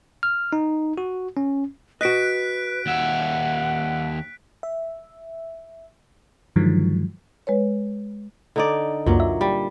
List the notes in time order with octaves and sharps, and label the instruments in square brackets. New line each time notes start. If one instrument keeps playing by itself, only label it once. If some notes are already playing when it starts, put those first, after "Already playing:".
[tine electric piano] F6
D#4
F#4
C#4
[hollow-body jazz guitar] F#4 D#5 [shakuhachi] B4 [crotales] F#6 B6 D7
[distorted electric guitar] D#2 E5 [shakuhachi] F#5
[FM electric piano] E5
G2 D3 D#3 F3 F#3 G#3
[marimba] G#3 B4 C#5
[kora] D3 D#4 D5
[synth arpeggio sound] C#2 F#2 A#3 [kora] A#2 F#3
[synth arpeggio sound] E5
[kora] G3